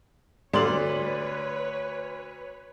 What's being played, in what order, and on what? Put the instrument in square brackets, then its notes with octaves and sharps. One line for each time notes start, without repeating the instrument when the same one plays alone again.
[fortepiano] D2 C6 [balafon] G4 A4 [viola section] B4 C#5 [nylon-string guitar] D5